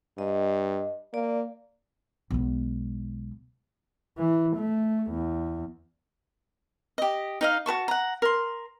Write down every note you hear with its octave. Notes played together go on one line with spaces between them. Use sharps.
G2 D#5
A#3 D5
B1 G#3
E3
A3
E2
G4 D#5
D#4 D#5 F5
F#4 B4 A5 C#6
F#5 A#5
A#4 C6